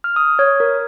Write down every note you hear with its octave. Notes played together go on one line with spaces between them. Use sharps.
F6
D#6
C#5
A#4